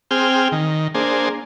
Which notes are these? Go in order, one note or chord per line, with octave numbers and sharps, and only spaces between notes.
C4 G#4 G5 F6
D#3
A#3 D4 G#4 C5